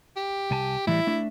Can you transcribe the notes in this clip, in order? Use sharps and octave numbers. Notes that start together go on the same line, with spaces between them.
G4
C2 G#5 A5
A2 E3 G3 E4
A3 D4 E5